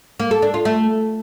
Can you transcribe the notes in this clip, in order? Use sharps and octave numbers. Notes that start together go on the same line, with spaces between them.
A#3
A4
D4
F4
A3